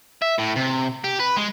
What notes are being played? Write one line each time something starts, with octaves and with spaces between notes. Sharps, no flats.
E5
A2
C3
G4
B4
G#3